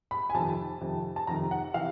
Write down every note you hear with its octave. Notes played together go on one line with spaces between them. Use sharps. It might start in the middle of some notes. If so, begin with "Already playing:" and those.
B5
G#5
F2 C3 D#3 A5
F2 C3 D#3
A5
F2 C3 D#3 A#5
F#5
C3 E3 F5